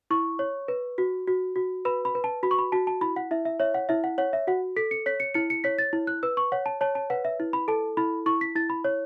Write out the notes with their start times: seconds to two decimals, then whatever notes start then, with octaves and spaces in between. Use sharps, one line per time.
0.10 E4 C#6
0.39 C#5
0.68 B4
0.98 F#4
1.27 F#4
1.56 F#4
1.85 B4 B5
2.05 B5
2.15 B4
2.24 A5
2.43 F#4 B5
2.51 C#6
2.58 B5
2.72 F#4 A5
2.87 A5
3.01 E4 B5
3.16 F#5
3.31 E4 E5
3.45 E5
3.60 C#5 E5
3.74 F#5
3.89 E4 E5
4.04 F#5
4.18 C#5 F#5
4.33 E5
4.47 F#4 F#5
4.76 A4 B6
4.91 C#7
5.06 C#5 B6
5.20 C#7
5.34 E4 C#7
5.50 C#7
5.64 C#5 B6
5.79 A6
5.93 E4
6.07 F#6
6.23 B4 E6
6.37 C#6
6.52 C#5 F#5
6.66 A5
6.81 C#5 A5
6.95 A5
7.10 B4 F#5
7.25 E5
7.40 E4
7.53 B5
7.68 A4 A5
7.97 E4 B5
8.26 E4 C#6
8.41 B6
8.55 E4 A6
8.70 B5
8.84 C#5